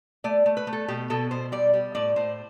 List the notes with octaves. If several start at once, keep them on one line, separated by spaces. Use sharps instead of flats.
A3 D5
A3
B4
A3
A4
B2 G4
B2 A4
B2 C5
G3 D5
G3
A2 D5
A2 C5